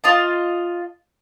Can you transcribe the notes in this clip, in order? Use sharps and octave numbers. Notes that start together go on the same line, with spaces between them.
F4 D#5 A5